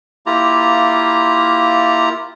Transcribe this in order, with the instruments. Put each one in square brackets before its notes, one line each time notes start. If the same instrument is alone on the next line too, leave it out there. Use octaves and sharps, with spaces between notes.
[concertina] A#3 E4 F4 G4 A#5